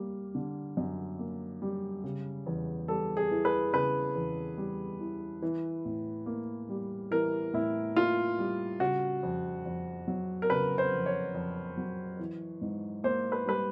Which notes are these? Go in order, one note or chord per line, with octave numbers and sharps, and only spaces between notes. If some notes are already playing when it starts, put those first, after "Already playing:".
Already playing: G3 A#3
D3
F#2
A#3
G3
C#3
E2
G3 A4
G#4
E3
B4
C#3 B4
E2
G3
E3
E3
A2
A#3
G3
E3 A#4
A2 E4
A#3 F4
G3
C#3 F#4
F2
F2
F#3
A#4
C#3 B4
C5
F2
C#5
F2
F#3
E3
G#2
A#3 C5
B4
G3 B4